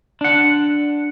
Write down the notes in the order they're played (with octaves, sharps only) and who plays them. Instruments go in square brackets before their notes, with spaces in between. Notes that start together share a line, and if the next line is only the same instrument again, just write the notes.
[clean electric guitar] D4 F#5